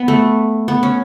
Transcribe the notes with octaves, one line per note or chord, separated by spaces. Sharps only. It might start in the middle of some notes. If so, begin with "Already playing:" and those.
Already playing: B3
A3
B3
C#4